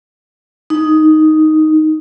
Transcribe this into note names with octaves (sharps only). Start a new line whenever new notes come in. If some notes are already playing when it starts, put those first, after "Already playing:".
D#4